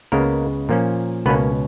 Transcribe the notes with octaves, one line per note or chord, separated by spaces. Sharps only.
C#2 C#3 G#3 A#3 B3 A#4
A#2 F3 A#3 C#4
C#2 B2 A#3 B3 C#4 B4